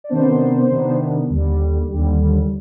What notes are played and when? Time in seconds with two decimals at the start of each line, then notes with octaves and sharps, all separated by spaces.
0.04 D5
0.09 C3 D#3 B3 D4 C5
0.70 C3 D#3 B3 D4
1.30 D#2 D3 G3
1.91 D#2 D3 G3